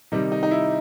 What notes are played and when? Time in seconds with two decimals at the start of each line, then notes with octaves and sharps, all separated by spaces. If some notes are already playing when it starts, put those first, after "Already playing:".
0.12 C3 D#3 G3 D#4
0.32 D#4
0.43 D#4
0.51 E4